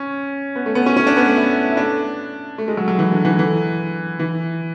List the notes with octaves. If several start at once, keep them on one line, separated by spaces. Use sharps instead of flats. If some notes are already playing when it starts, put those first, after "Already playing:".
Already playing: C#4
B3
A3
B3
C#4
C#4
D4
B3
A3
E4
E4
D4
A3
G#3
F#3
F#3
E3
D3
E3
E3
E3